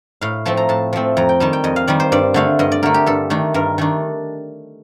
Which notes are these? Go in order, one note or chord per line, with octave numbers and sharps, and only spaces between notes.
A2 F5
F3 A3 C4 A5
A#5
A2 A5
F3 A3 C4
F2 A#5
G5
D#3 G3 A5
G5
F2 D#5
F5
D#3 G3 D5
C5
G2 D5
D3 A3 F5
G2 D#5
D5
D3 A3 A#4
G4
G2 A4
D#3 A3 D4
G2 A#4
D#3 A3 D4